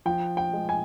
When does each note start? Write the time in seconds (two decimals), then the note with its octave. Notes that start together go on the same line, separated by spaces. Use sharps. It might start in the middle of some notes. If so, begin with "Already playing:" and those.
0.06 F3 G5
0.37 G5
0.53 G#3
0.69 G#5